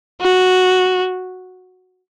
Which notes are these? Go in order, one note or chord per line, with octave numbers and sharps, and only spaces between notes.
F#4